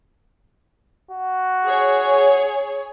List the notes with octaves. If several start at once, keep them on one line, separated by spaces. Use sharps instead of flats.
F#4
G#4 C#5